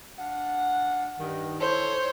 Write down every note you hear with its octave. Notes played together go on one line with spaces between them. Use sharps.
D4 F5 F#5
G2 D#3
E4 A4 C5 C#5